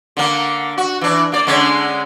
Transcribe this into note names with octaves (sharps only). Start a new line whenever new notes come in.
D3 A#3
F#4
E3 D4
A#3 D5
D3 G#3 C#4